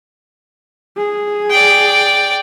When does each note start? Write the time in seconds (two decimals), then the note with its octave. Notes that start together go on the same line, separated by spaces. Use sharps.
0.97 G#4
1.50 D5 G5